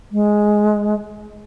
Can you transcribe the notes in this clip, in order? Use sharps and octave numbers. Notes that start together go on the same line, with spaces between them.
G#3